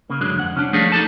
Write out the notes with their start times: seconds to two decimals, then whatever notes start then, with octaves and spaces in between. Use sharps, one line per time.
0.10 C#3 A#3
0.21 G2 D3 F#3 G#3
0.35 F2 F#5
0.55 C2 C#4 D4
0.73 F3 G3 A3 A#3 G#4 C#5
0.92 D#4 G4 A4 A5